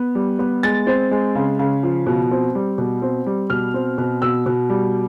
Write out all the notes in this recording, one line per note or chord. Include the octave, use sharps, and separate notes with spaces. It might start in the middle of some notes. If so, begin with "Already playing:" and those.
Already playing: B3
G3
B3
G#3 A6
C4
G#3
C#3
C#3
F3
B2
C4
G3
B2
C4
G3
B2 F6
C4
B2
B2 E6
B2
G3